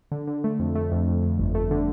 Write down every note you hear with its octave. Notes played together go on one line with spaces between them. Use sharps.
D3
D3
A3
F2
A3
F2
F2
F2
G1
A3
D3